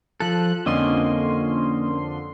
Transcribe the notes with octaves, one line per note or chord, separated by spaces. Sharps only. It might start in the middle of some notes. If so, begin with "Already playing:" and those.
F3 A4 F#6
F2 D3 A#3 C#4 D#5 C6